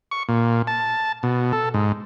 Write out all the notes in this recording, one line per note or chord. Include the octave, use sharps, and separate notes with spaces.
C#6
A#2
A5
B2
A4
G#2